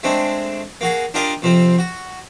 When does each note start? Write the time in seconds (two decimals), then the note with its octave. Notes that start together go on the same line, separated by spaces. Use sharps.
0.03 G#3 A3 C4 D4
0.81 A#3 F#4 G#4
1.14 D4 F4 G4 A#4 D5 D#5
1.42 F2 C3 F3 C4
1.78 F#4